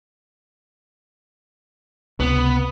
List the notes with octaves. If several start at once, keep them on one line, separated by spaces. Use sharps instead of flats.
C#2 C3 B3